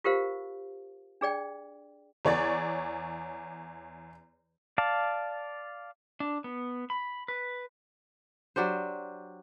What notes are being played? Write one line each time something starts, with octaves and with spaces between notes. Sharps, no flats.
F4 G4 A#4 C5 F5
D4 G#4 D5 G5
E2 C#5 D5 A6
D5 F5 A5
D4
B3
B5
B4
F#3 D4 G4 C5